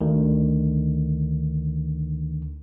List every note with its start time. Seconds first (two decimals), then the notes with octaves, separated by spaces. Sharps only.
0.01 D2 D3 D#3